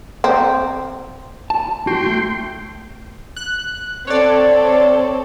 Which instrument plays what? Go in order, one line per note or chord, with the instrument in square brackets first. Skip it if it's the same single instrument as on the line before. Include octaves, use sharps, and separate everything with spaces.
[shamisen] C4
[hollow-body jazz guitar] A5
[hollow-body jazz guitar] F#4 [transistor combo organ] G5 C6
[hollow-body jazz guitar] A3
[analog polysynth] F#6
[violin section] C4 A4 [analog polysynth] C#5 D5